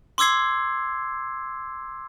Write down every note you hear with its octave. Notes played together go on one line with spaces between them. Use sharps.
C6 D6 E6 G#6 C7